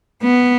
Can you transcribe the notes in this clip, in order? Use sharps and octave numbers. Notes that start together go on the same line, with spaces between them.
B3